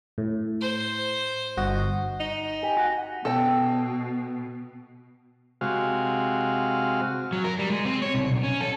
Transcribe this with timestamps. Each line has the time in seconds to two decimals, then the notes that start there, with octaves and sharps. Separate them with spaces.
0.18 A2
0.61 C5
1.57 G1 F#4 D#5
2.20 D#4
2.63 G4 G#5
2.77 F#4 F#5
3.25 B2 A4 G5
5.61 C3 G#3 F#4 F5
7.33 F#3
7.44 A#4
7.59 G3
7.70 G#3
7.85 C4
8.02 C#5
8.14 C2
8.28 B1
8.43 C#4
8.61 A4